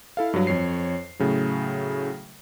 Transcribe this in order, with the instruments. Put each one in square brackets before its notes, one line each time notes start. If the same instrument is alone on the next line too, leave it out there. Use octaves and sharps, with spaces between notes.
[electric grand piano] E4 A4 F5
G2 F#3
F2 C#5 C7
A2 C#3 F#3